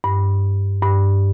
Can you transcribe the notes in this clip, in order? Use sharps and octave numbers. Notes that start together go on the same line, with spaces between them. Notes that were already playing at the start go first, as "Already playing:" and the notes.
G2
G2